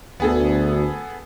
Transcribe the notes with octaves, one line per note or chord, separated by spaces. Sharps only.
D2 B3 G#4 A4